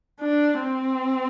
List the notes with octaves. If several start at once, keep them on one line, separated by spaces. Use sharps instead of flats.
D4
C4